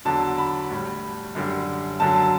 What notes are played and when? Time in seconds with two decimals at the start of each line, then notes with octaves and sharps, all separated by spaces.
0.05 E2 D3 F#3 A5
0.38 B5
0.70 A2 G3
1.35 F#2 D3 G3
2.00 F#2 D3 F#3 A5
2.16 A5